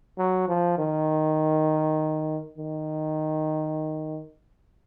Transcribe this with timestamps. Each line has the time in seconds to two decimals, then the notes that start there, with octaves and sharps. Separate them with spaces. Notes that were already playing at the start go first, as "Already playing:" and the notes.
0.18 F#3
0.48 F3
0.78 D#3
2.58 D#3